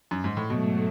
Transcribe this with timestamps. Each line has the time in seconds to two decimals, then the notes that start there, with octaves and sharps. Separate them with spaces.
0.11 F#2
0.24 G#2
0.37 A2
0.50 G#2 B2 F#3 A3